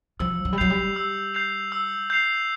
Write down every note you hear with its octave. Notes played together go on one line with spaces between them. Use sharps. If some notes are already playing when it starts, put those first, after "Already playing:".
F3 E6
F#3
G3
F#3 G6 C7 F7
G3
E6
G6 C7 F7
E6
G6 C7 F7